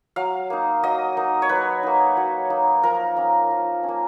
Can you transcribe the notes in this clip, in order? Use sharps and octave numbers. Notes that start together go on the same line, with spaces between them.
F#3 F5
A#3 D#4
F#3 D#5
A#3 D#4
C#5
F#3 B4
A#3 D#4
F#3
A#3 D#4
F3 A#4
A#3 C#4
F3
C#4
A#3